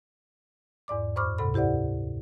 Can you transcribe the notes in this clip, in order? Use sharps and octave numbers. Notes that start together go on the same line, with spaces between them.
E2 G#2 D5 D6
F#2 C5 B5 C#6 D6 F6
D2 G#2 C3 A4 B5
E4 G4 C5 D5 F#5